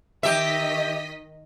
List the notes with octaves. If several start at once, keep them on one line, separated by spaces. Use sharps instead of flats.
D#3 G4 D#5 E5 B6